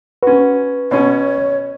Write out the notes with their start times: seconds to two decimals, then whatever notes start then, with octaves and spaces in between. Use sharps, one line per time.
0.23 C#4 F#4 B4
0.91 B2 C#4 C#5